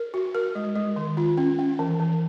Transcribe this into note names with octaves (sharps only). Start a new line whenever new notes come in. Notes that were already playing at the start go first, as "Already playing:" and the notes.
Already playing: A#4
F#4
A#4
G#3
G#3
D#3
F4
C#4
C#4
E3
E3